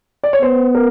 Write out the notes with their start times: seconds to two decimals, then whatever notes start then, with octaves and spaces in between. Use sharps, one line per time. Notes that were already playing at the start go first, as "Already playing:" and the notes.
0.24 D5
0.33 C#5
0.42 B3 C5
0.75 A#4